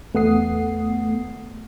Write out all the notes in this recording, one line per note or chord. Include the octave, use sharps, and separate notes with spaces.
E2 A3 B3 F#5 D#6 C7